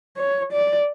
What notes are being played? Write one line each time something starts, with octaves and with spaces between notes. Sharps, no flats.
C#5
D5